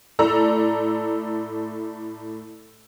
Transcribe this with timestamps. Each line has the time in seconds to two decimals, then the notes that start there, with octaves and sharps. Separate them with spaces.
0.19 A2 A3 A4 D5 A#5 E6